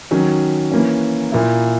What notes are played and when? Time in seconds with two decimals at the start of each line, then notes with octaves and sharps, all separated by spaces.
0.11 D#3 F#3 C#4
0.72 E3 A#3 C#4
1.32 A#2 A#3 E4